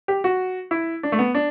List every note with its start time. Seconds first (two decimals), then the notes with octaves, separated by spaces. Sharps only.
0.08 G4
0.24 F#4
0.71 E4
1.03 D4
1.12 A3
1.19 B3
1.35 D4